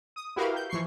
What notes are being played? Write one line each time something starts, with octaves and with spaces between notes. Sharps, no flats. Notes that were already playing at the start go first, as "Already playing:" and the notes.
D#6
E4 F#4 G4 A#4 B4 F5
G6
E3 F3 C#6 C7